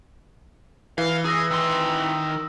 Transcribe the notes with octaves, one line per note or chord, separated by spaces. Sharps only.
E3 F5
G#4 D#6 E6 A#6
D#3 C6 E6